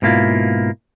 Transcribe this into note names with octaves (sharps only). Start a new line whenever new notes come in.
G#2 B2 A#3 E4 F4